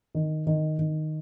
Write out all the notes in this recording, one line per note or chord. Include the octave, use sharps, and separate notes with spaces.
D#3
D#3
D#3